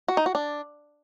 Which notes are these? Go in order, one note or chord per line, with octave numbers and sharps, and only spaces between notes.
F#4
D#4
F#4
D4